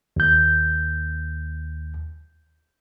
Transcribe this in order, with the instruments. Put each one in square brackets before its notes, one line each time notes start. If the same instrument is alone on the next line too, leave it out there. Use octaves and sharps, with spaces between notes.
[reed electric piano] D#2 G6